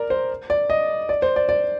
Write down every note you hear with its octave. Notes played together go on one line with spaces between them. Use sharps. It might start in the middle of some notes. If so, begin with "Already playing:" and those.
Already playing: A#4 D5
C5
D5
D#5
D5
C5
D5
D5